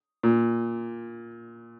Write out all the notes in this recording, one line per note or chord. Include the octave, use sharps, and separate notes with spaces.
A#2